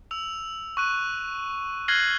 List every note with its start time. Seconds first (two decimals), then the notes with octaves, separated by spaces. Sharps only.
0.11 E6 F7
0.77 C#6 F#6 D#7
1.88 F6 F#6 G#6 A#6 C7 F#7